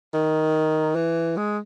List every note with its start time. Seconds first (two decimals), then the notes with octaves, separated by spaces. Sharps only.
0.13 D#3
0.95 E3
1.37 G#3